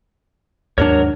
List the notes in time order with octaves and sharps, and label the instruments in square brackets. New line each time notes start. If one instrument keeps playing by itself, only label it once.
[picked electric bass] D#2 G#2 D4 [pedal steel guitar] F#3 A#4 C#5